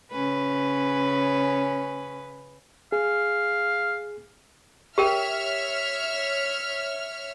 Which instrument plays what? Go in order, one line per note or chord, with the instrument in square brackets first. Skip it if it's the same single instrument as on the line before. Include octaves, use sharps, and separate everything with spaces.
[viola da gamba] C#3 C#4 B4
[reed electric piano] G#4 [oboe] F5
[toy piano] G4 A#4 G5 [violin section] C#5 E5 F6